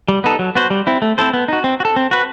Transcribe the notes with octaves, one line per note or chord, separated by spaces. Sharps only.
G3
B3 D#4 A4
F#3
B3 F#4 C5
G3
C4 E4
A3
C4 E4 A4 C5
B3
D#4 F#4
C4
F#4
A4
C4
F#4 B4